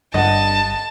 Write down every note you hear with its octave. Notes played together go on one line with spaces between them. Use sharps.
G1 G2 D#5 F#5 A5